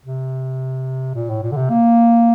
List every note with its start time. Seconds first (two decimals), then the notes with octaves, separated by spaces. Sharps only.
0.06 C3
1.15 A#2
1.30 A2
1.43 A#2
1.52 D3
1.57 C3
1.70 A#3